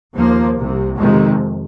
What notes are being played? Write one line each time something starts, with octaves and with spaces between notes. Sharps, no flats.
D#2 F3 A#3
C2 C3
F2 C3 D#3 G#3